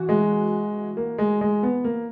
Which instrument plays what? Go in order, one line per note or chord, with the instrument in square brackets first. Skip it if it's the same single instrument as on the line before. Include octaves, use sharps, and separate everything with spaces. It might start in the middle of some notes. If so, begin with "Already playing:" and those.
Already playing: [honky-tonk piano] E3 F#4
[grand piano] G#3
A#3
G#3
G#3
B3
A#3